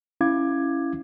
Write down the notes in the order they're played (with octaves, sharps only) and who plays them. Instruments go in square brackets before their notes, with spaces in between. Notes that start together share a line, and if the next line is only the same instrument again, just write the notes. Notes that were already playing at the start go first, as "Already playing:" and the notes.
[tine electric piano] C#4 E4 F5 D6 G#6